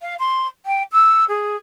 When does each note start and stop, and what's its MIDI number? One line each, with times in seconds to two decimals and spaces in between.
0.01 0.15 77
0.19 0.47 84
0.66 0.83 79
0.92 1.24 88
1.28 1.56 68